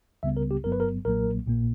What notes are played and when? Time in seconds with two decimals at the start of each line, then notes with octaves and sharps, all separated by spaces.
0.23 C#2 C#3 G3 B3 E5
0.37 A#4
0.51 G4
0.64 G1 G2 F#3 B3 A#4
0.72 B4
0.80 A#4
1.05 B1 A#2 F#3 A#3 A#4
1.46 A#1 A#2 A#3